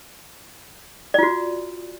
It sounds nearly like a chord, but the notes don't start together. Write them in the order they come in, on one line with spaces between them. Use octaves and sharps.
D5 F4 F#4